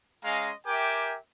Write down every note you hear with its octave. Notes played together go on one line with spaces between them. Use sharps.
G#3 C#4 D#5 F5 A#5 C6
G4 A#4 E5 G5 G#5 D6